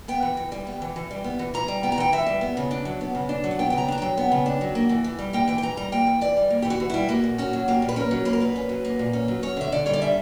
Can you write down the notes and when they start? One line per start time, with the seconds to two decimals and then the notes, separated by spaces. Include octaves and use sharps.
0.08 B3 G5
0.22 E3
0.37 E3
0.52 G3
0.67 B3
0.82 E3
0.96 E3
1.11 G3
1.24 B3
1.39 E3
1.54 E3 A#5
1.68 G3
1.83 B3 G5
1.92 A#5
1.98 E3 G5
2.12 E3 E5
2.27 G3
2.41 B3
2.57 C#3
2.71 D4
2.85 F#3
3.01 B3
3.15 C#3
3.29 D4
3.44 F#3
3.51 F#5
3.59 B3 G5
3.70 C#3 G5
3.78 A#5
3.88 D4 A#5
3.98 F#3 G5
4.17 B3
4.32 C#3
4.46 D4
4.61 F#3
4.75 A#3
4.89 E3
5.04 E3
5.19 G3
5.33 A#3 G5
5.48 E3 G5
5.58 G5
5.62 E3 A#5
5.77 G3 A#5
5.92 A#3 G5
6.07 E3
6.21 E3 D5
6.37 G3
6.50 A#3
6.62 E3 G4
6.70 F#4
6.80 E3
6.90 G3 E4
7.09 A#3 F#4
7.24 A#2
7.38 C#4 F#4
7.53 F#3
7.68 A#3 G4
7.82 A#2
7.89 B4
7.96 C#4 A#4
8.11 F#3
8.25 A#3 B4
8.33 A#4
8.40 A#2 B4
8.56 C#4
8.69 F#3
8.85 A#3
8.99 A#2
9.13 C#4
9.28 F#3
9.43 C#4 C#5
9.57 D3 E5
9.72 D3 D5
9.86 G3 C#5
9.93 D5
10.01 C#4 E5